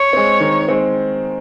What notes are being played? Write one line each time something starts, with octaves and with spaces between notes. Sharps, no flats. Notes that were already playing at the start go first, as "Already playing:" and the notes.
Already playing: C#5
G#3 C4
D#3
G#3 C4